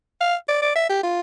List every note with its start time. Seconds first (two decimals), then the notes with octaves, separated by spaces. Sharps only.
0.21 F5
0.48 D5
0.62 D5
0.76 E5
0.90 G4
1.04 F4